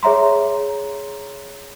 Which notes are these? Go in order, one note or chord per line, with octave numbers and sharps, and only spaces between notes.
G#4 C#5 E5 A#5 C6